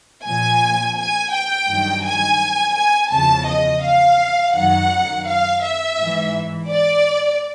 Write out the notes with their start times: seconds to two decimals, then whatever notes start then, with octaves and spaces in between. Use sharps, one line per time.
0.25 A#2 F3 G#5
0.97 G#5
1.33 G5
1.68 G2 D#3 F#3
2.05 G#5
2.75 G#5
3.12 E2 C#3 F3 A5
3.48 D#5
3.83 F5
4.56 F#2 D#3 F#3 F#5
5.26 F5
5.63 E5
5.99 G#2 E3
6.70 D5